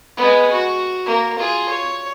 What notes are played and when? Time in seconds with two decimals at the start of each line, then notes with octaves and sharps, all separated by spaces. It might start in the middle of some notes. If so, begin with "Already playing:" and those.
0.17 G#3 B3
0.52 F#4
1.06 A#3
1.39 F4 G#4
1.69 C#5